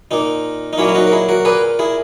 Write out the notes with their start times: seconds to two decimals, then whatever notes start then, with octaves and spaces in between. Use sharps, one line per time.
0.11 A#2 A#3 D#4
0.73 D#4
0.78 A#2 F#3 A#3 C#4 E4
0.88 E4
0.95 D#4 F#4
1.07 A#4
1.12 E4 G#4
1.29 F#4 A#4
1.45 A#2 A#3 G#4 B4
1.79 E4 G#4